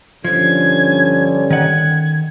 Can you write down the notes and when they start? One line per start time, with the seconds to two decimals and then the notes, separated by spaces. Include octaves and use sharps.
0.25 G2 D3 F3 C#4 G#6
1.50 D#3 F#5 G#6